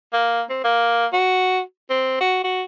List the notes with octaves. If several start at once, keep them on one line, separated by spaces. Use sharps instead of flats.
A#3
C4
A#3
F#4
C4
F#4
F#4